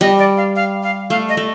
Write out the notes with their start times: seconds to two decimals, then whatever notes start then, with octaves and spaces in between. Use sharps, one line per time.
0.01 G3 D#5
0.18 D5
0.37 F5
0.56 F5
0.83 F5
1.10 A3 F5
1.29 D#5
1.37 A3